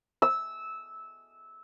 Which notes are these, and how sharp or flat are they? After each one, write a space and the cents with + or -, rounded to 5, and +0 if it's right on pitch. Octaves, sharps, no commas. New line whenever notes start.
E6 -15